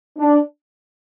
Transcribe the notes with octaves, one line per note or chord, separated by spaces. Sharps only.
D4